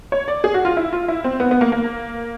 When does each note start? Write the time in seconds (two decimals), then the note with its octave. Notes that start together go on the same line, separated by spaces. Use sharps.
0.12 C#5
0.28 D5
0.44 G#4
0.54 F#4
0.65 F4
0.77 E4
0.93 F4
1.08 E4
1.24 C4
1.40 B3
1.51 B3
1.61 A#3
1.72 A#3